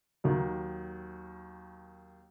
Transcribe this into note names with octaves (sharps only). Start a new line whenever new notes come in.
D#2 D#3 F#3